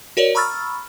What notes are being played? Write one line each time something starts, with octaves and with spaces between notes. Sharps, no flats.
F#4 A#4 C#5 D5
A#5 B5 C#6 E6 F6 A6